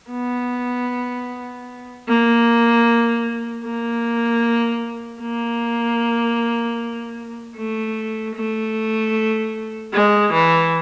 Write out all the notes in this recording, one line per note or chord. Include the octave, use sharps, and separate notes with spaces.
B3
A#3
A#3
A#3
A3
A3
G#3
E3